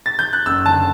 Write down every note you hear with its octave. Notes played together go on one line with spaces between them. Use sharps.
A6
G6
F#6
F#1 E6
D3 A5